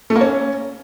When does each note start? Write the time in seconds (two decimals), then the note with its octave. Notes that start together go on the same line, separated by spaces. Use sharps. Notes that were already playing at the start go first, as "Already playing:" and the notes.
0.10 A3
0.16 A#3
0.21 C#4